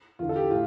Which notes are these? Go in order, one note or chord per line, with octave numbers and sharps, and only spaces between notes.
E2 D3 F4
A4
G4
A2 F4